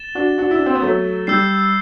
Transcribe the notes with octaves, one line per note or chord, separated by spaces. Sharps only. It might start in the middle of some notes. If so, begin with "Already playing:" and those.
Already playing: A6 E7 G7
D4 F#4
D4 F#4
E4
D4
C4
B3
F#3 A3
G3 E6 G6 C7